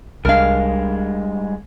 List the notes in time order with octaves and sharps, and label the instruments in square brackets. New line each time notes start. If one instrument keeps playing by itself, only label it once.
[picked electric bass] C2 D4 [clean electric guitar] G2 G#3 [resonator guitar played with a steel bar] A#4 F5